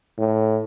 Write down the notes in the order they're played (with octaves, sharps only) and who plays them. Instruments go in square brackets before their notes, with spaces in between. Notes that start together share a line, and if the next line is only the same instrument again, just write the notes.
[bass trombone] A2